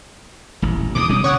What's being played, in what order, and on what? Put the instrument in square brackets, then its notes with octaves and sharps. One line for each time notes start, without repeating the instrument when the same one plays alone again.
[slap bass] D#1 A1
[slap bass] E1 D2 G#2 [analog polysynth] D6 D#6
[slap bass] B2 G3 C#4
[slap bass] C#3 [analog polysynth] C#5 F#5